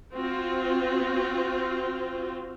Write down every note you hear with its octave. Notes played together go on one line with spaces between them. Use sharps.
C4 F4 F#4